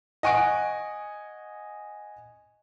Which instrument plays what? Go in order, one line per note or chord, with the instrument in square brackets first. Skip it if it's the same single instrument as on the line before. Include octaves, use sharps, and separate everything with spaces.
[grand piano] D#5 F#5 G#5 C#6 F#6 D7